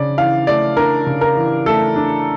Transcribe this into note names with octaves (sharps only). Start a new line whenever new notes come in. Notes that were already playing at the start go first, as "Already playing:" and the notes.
Already playing: C#3 D4 D5
E3 F5
A3 D5
D4 A#4
C#3
A#4
E3
A3 A4
D4